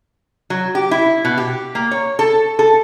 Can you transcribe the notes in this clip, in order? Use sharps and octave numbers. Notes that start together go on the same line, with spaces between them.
F#3
G4
E4
B2
G4
A#3
C#5
A4
A4